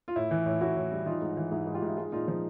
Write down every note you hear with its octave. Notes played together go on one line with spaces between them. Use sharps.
F4
A2 E4
E3
A2
A2 E4 F#4
A2
G3
E3 D#4 F4
G#2
E3
G#2 E4
G#2
F4 G4
G#2
E4
G#3 D#4 F4
A#2 D#4 F4
F3 D#4